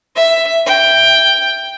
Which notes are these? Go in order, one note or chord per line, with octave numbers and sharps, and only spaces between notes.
E5
G5